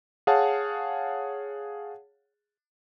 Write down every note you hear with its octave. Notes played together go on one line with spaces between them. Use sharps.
G#4 C#5 F5 F#5 A5